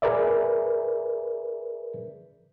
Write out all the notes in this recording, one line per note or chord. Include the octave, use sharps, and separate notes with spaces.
G#4 A#4 B4 D5 E5